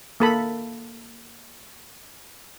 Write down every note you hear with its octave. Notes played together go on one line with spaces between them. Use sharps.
A#3 A4 B5